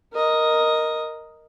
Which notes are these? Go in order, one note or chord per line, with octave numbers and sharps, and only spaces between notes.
A#4 D#5